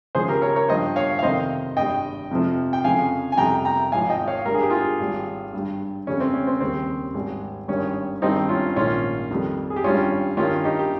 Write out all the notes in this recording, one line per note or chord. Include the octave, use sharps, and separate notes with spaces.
C#2 C#3 F3 G#4 C5
G4 A#4
A#4 C#5
A#4 C#5
G2 F3 C5 D#5
C#5 F5
F5
F2 C3 D#3 C5 D#5
G#1 G2 G3 D#5 G5
F2 C3 F3
G5
F2 C#3 F3 F5 G#5
G#5
F2 C3 G3 G5 A#5
G5 A#5
G#1 G#2 F3 F5 G#5
D#5 G5
C#5 F5
G2 G3 A#4
G#4
G4
F4 G#4
G#1 G#2 G3
G2 G3
F2 C#3 G3 C#4
C4
C#4
C4
D#2 C#3 G3 C4
G#1 G#2 G3
G#1 G2 D#3 G3 C#4
G#1 G2 D#3 G3 C4 D#4
C#4 F4
A#1 G#2 D#3 C#4 F4
F2 D#3 G3
G#4
G4
G#1 G2 G3 C#4 F4
G2 D#3 G3 C#4 F4
D#4 G4
G4